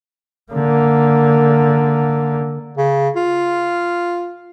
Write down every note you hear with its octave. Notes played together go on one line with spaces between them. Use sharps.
D3 A#3
C#3
F4